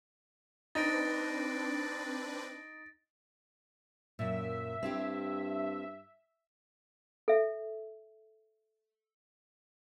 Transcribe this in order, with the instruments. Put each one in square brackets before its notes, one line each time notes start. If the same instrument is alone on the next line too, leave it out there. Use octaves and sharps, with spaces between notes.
[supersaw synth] C4 D4 B4 [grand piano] D#4 [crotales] A6 A#6 D7
[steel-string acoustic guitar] F#2 A#2 [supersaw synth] E5
[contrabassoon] G2 [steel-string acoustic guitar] C4 E4 G4
[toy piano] A4 E5